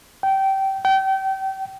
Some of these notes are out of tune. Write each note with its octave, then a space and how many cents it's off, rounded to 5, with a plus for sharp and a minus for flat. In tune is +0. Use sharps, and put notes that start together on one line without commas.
G5 -20
G5 -30